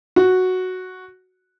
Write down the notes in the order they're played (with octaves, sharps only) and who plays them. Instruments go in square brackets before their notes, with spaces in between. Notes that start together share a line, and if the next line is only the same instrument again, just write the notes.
[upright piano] F#4